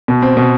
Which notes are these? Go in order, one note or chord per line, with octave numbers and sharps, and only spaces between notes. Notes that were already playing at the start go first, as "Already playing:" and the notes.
B2
C4
B2